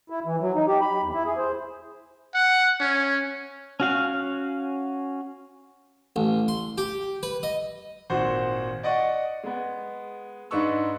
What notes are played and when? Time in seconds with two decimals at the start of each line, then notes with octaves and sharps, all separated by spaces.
0.10 E4
0.25 E3
0.40 F#3
0.55 D#4
0.67 G4
0.81 B5
1.02 E2
1.14 E4
1.25 G#4
1.37 C5
2.34 F#5
2.80 C#4
3.80 C#4 F#4 F5
6.16 A1
6.48 C6
6.78 G4
7.23 B4
7.43 D#5
8.10 G#1 A#2 F#4 C5 C#6
8.83 D5 D#5 F#5 C#6
9.44 G#3 B3
10.51 G#2 D4 D#4 B4 C#6 E6